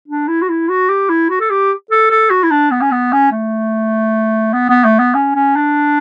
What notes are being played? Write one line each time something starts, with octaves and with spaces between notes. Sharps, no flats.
D4
E4
F#4
E4
F#4
G4
E4
F#4
A4
G4
A4
A4
F#4
E4
D4
B3
C#4
B3
C#4
A3
B3
B3
A3
B3
C#4
C#4
D4